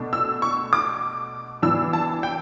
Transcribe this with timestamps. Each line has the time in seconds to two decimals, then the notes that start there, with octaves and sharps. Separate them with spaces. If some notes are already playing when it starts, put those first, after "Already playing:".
Already playing: B2 A3 D4
0.13 E6
0.42 C#6
0.73 D6
1.62 E3 B3 D4 E6
1.93 A5
2.23 G5